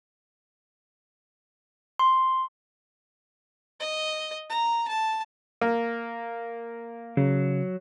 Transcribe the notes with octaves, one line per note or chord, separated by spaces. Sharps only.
C6
D#5
A#5
A5
A#3
C#3 F#3